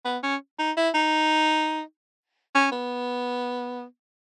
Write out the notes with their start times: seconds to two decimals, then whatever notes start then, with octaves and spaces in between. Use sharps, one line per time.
0.05 B3
0.23 C#4
0.59 D#4
0.77 E4
0.95 D#4
2.55 C#4
2.72 B3